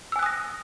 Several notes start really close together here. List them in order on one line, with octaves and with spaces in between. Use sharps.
E6 G#5 F#6 D#6 A#6